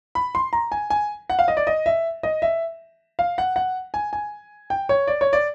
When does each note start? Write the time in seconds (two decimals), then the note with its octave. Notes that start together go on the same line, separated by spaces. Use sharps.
0.15 B5
0.35 C6
0.53 A#5
0.72 G#5
0.90 G#5
1.30 F#5
1.39 F5
1.48 D#5
1.57 D5
1.67 D#5
1.86 E5
2.23 D#5
2.42 E5
3.19 F5
3.38 F#5
3.56 F#5
3.94 G#5
4.13 G#5
4.70 G5
4.89 C#5
5.07 D5
5.21 C#5
5.33 D5